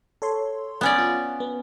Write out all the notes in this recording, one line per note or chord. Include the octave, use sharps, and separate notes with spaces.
A4 C#5 C6
B3 C#4 D5
F4
B3